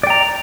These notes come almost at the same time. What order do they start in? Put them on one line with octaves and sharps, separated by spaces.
D5 G5 A#5